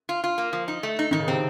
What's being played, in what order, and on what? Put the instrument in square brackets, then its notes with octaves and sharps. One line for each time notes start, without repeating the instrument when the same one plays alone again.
[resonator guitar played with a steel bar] F4
F4
A#3
F3
D#4
A3
D#4
[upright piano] D#3 [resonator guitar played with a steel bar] D#4
[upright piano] C#3
[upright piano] C3 [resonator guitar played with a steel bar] C4